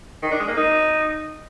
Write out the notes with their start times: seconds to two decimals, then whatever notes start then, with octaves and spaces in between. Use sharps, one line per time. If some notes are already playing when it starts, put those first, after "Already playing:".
0.23 D#3
0.31 D4
0.40 G#3
0.48 A#3
0.57 D#4